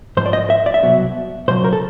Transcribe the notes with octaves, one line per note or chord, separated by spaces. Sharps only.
G#2 F3 C5
D5
D#5
E5
D5
E5
C2 B2 F#3
C#2 B2 F#3 C5
A#4
A4